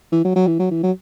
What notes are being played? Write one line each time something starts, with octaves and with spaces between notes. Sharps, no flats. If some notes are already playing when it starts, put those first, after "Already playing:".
E3
F#3
F#3
E3
F#3
E3
F#3